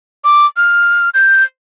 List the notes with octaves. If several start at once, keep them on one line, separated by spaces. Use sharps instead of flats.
D6
F6
G6